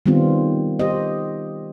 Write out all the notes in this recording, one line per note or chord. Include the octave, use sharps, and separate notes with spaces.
D#3 G3 B3 C4 F4
G4 C5 D#5